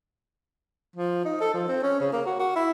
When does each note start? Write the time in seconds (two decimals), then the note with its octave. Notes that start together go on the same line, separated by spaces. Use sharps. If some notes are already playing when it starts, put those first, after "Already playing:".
0.96 F3
1.25 D#4
1.41 A4
1.54 F3
1.68 C4
1.83 C#4
2.00 C#3
2.13 A#3
2.26 F#4
2.40 F#4
2.56 E4